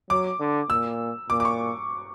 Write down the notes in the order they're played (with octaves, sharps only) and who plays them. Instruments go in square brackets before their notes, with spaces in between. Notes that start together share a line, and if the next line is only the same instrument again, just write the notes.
[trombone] F#3 [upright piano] D6
[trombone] D3
[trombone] A#2 [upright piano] E6
[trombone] A#2 [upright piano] D6
[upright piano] D6
C#6